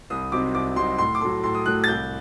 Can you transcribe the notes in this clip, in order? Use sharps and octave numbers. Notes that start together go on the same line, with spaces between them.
C2 D#6
C3 F#3 C4 D#4 D6
C2 D6
C3 F#3 C4 D#4 C6
A2 C6
D6
F#3 A3 C6
A2 C6
D#6
F#3 A3 F#6
A6
C2 G6